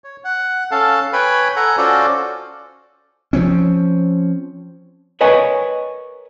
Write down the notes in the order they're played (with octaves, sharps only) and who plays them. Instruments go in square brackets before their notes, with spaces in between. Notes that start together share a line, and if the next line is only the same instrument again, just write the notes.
[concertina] C#5
F#5
C#4 A4 F5 A5
B4 C#5 G5 G#5 B5
A4 F#5 G#5 A#5
C#4 F4 F#4 A4 C5 D5
[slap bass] F3 C4 C#4
[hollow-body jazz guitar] A#4 B4 C#5 D#5 G#5